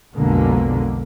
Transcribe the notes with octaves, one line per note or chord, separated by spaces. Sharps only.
B1 F2 B2 D3 G#3 A#3